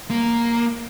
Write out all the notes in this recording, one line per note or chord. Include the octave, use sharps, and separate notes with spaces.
A#3